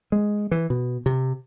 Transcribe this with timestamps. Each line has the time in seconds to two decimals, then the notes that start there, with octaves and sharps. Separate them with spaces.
0.12 G#3
0.51 E3
0.70 B2
1.06 C3